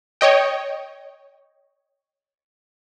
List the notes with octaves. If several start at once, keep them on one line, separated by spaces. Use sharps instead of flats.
C#5 D#5 G5